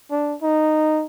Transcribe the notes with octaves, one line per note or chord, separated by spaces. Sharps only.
D4
D#4